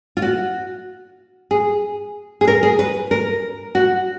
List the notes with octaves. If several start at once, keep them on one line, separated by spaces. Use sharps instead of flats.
F4
F#4
G#4
G#4
A#4
G#4
B4
A#4
F#4